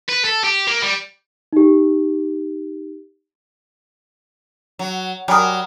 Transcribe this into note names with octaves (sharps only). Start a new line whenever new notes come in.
B4
A4
G4
A#3
G3
D#4 G4
F#3
F#3 G3 A#4 G#5 B5 D#6